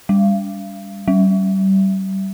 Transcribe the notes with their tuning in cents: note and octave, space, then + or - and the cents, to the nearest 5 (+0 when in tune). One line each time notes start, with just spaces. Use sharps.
G3 +25
G3 -30